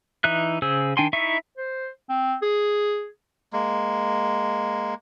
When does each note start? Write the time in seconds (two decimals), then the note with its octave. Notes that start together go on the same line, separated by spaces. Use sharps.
0.24 E3 D#4 E5 F#6
0.62 C#3 G#4 C5 E6
0.97 D#3 D4 G5 G#5 C6
1.13 D#4 E4 E5 C#6
1.58 C5
2.09 C4
2.42 G#4
3.53 G#3 A#3